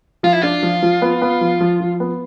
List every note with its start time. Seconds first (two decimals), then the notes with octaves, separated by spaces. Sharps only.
0.23 F3 F4
0.33 E4
0.42 D4 F4
0.63 F3
0.83 F3
1.02 B3
1.22 B3
1.41 F3
1.61 F3
1.80 F3
2.00 B3